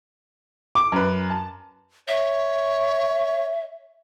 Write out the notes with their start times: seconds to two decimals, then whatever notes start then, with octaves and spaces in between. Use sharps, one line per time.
0.75 D6
0.92 F#2 B4
1.30 A5
2.08 C#5 E5